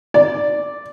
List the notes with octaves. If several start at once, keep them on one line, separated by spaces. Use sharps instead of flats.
D5